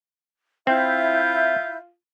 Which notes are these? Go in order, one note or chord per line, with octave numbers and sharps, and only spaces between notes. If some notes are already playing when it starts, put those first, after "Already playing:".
C4 E4 F4 E5 G6